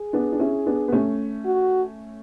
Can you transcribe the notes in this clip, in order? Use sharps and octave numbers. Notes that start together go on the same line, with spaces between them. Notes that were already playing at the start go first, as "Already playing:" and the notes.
Already playing: G#4
B3 D4
D4
C#4 E4
B3 D4
B3
A3 C#4
F#4